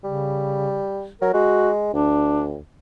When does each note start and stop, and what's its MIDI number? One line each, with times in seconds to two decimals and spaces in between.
0.04 0.81 49
0.04 1.07 55
1.21 1.33 54
1.21 1.31 70
1.34 1.92 56
1.34 1.70 66
1.93 2.58 38
1.93 2.47 62